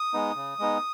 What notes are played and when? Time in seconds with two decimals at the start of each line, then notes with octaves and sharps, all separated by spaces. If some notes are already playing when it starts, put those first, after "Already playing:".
Already playing: D#6
0.13 G#3 B3 D#4
0.36 C#3
0.59 G#3 B3 D#4